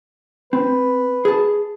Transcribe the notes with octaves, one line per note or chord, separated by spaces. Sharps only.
C4 B4
G#4 A5